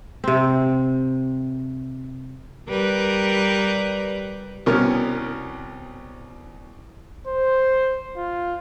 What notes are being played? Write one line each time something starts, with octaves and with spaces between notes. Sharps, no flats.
C3 C4
G3 A#4 B4
C2 B2 C#4 A#4 F6
C5
F4